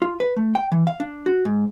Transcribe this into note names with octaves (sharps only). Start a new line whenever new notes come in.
F4
B4
A3
G5
E3
F5
D4
F#4
G#2